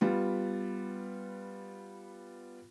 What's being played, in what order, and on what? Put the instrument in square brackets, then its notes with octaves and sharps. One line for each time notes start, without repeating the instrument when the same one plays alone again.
[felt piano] G3 B3 F4